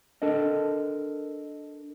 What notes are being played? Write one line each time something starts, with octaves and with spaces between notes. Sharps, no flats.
D4 A4 A#4 D#5